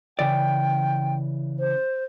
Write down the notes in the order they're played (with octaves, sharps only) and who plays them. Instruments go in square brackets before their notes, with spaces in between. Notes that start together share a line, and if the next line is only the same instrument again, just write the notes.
[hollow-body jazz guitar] C#3 E3 D5 [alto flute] G5
[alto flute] C5